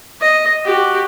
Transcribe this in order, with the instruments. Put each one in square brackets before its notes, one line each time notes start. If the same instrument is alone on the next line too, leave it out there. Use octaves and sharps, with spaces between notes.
[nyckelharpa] D#5
F#4 G4